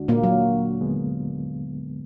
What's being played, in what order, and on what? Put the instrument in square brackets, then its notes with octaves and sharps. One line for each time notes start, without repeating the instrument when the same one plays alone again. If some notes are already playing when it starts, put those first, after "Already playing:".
Already playing: [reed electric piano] D2 D3 G#3 D4 F#4
[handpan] A#2 A#3
F#3
[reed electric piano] D#2 D3 G#3 B3